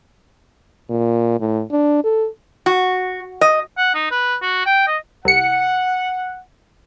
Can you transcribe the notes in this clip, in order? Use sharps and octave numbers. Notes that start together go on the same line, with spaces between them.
A#2
A2
D4
A4
F#4
D#5
F#5
D#4
B4
F#4
G5
D#5
C2 F#5 C#7